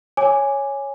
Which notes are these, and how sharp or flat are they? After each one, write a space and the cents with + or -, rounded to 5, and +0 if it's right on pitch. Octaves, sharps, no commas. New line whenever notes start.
C#5 +0 G#5 +0 D6 +0